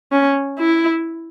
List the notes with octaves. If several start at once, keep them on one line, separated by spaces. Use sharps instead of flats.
C#4
E4